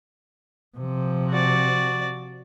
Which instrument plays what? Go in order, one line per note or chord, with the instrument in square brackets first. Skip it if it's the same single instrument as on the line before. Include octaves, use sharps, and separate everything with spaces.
[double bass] C3 F3
[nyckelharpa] F#4 D5